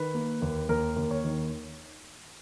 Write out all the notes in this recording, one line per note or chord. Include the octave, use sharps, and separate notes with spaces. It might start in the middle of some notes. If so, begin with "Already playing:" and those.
Already playing: D#3 B4
A#3
D#2
D#2 A#4
D#2
C#5
D#3